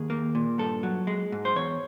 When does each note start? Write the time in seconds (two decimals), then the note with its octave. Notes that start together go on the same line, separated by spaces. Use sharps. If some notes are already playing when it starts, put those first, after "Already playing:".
Already playing: D#2 G#4
0.10 A#3
0.35 A#2
0.58 G2 A4
0.83 F#3
1.07 G#3
1.32 G#2
1.45 C5
1.56 E2 C#5